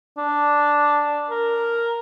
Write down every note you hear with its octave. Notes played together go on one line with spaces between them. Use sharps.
D4
A#4